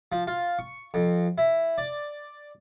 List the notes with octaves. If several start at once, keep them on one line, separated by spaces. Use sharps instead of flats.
F3
F4
C#6
F2
E4
D5